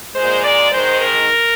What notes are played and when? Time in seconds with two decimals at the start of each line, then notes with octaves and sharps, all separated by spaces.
0.16 A#2 G#3 C5
0.44 D5
0.72 G#2 D#3 G#3 C5
1.01 A#4